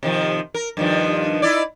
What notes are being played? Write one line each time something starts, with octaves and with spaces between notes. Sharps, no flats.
C3 D#3 F3
A#4
G2 D#3 F3
D#4 E4 D5